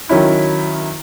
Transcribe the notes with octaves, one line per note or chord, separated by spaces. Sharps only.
D#3 F#3 C#4 E4